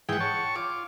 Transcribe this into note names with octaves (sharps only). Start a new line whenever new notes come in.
G#2 E3 G#4 F#5 G5
C#5 A5 C#6
F4 D6